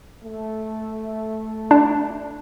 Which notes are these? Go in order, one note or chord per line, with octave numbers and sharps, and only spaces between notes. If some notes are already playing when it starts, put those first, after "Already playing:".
A3
D4